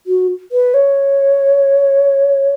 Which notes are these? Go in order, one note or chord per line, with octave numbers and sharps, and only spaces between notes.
F#4
B4
C#5